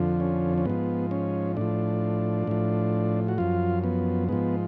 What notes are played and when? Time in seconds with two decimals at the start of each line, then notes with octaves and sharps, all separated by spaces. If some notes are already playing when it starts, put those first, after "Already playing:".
Already playing: F2 D3 F3
0.20 C#4
0.58 C#4
0.65 G#2 F3 B3
1.11 C#4
1.57 A2 F3 D4
2.47 A2 F3
3.28 F#4
3.38 F#2 F3 F4
3.84 B3
4.29 G#2 F3 B3